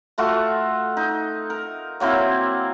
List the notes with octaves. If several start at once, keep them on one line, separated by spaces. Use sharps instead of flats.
A3 F4 F#4 A4
D#4
A#4
F#3 A#3 C4 E4